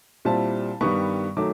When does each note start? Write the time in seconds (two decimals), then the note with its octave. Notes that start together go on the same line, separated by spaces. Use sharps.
0.25 A#2 G3 C4 E4 A5
0.81 G2 D#3 G3 B3 C#6
1.37 D#3 F#3 A3 D6